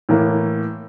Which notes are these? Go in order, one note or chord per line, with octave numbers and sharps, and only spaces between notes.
A2 E3 A#3